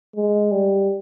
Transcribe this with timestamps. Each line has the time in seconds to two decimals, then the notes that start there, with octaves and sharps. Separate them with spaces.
0.16 G#3
0.51 G3